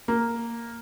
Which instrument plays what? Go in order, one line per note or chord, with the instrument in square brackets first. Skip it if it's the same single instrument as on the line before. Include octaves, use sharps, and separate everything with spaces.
[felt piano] A#3